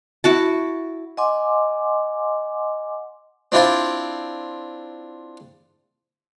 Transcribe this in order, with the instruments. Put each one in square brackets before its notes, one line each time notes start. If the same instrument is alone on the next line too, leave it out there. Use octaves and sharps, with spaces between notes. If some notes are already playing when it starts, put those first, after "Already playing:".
[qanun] E4 F#4 A5
[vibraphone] D#5 F#5 G#5 C6 D6
[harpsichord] C4 D4 E4 F4 C5